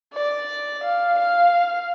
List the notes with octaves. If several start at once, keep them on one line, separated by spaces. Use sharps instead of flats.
D5
F5
F5